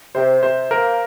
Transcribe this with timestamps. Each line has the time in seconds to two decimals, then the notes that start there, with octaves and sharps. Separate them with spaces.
0.15 C3 C5
0.43 C3 C5
0.71 A#3 A#4